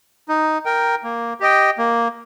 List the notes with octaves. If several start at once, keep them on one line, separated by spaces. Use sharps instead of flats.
D#4
A#4 G5
A#3
G4 D#5 G5
A#3